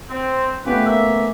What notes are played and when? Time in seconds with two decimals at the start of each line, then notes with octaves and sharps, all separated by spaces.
0.10 C4
0.65 A3 B3 C#4 F4 G4 B4
0.85 A#3 E5